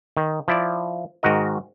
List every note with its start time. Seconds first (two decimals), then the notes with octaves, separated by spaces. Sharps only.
0.17 D#3
0.48 F3 E4 D5
1.23 G#2 D#3 F#4 A#4 D#5